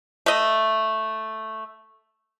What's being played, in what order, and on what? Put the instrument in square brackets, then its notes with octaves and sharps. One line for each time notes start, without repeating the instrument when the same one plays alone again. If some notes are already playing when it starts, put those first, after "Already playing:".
[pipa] A3 D#5